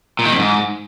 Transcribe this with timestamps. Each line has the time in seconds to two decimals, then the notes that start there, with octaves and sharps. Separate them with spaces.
0.19 A#2
0.26 D#3
0.32 F2
0.39 G#2